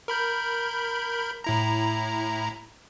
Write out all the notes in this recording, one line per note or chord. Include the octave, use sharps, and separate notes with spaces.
A#4 B5 G6
A2 E4 A#5